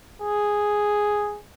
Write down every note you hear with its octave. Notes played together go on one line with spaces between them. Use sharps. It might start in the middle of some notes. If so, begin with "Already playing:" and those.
G#4